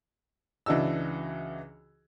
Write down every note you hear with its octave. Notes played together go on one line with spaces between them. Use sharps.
C#2 E3 D4 F#4 D#5 E6